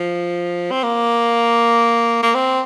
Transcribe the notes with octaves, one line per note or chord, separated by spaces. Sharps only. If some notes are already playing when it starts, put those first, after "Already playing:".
Already playing: F3
C4
A#3
A#3
C4